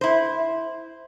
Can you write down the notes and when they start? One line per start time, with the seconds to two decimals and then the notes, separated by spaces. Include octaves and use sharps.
0.01 E4 C5